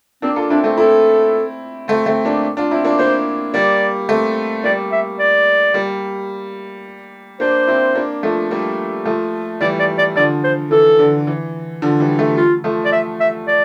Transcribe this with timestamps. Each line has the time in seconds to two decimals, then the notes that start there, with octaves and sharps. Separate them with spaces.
0.22 A#3 C4 D4
0.36 F4 A4
0.50 C4 D4 E4
0.64 A3 C4
0.78 C4 E4 A4
1.88 A3 C4
2.06 A3 C4
2.25 A#3 D4
2.57 D4 F4
2.71 C4 E4
2.84 A#3 D4
2.99 A#3 D4 C5
3.54 G3 A#3 D5
4.09 A3 C4
4.64 G3 A#3 D5
4.92 E5
5.19 D5
5.74 G3 A#3
7.40 A#3 D4 C5
7.67 C4 E4
7.95 A#3 D4
8.23 F3 A3
8.51 G3 A#3
9.05 F3 A3
9.61 E3 G3 D5
9.79 D5
9.98 D5
10.16 D3 F3 D5
10.44 C5
10.71 E3 A4
10.99 D3
11.27 E3
11.82 D3 F3
12.00 E3 G3
12.19 F3 A3
12.37 F4
12.64 F3 A3
12.85 D5
12.92 E5
13.20 E5
13.48 D5